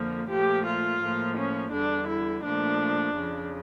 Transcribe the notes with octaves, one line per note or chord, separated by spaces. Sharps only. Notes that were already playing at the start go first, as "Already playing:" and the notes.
Already playing: F2 D3 F3 A#3
A#2 F3 A3 G4
F4
A2 F3 A#3
C#4
E2 D3 G3 D4
E4
A#2 F3 A3 D4
F2 C#3 F3